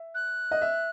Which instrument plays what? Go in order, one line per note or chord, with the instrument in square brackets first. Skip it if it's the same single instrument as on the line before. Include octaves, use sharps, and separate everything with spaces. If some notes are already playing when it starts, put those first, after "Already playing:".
Already playing: [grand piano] E5
[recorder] F#6
[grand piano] D#5
E5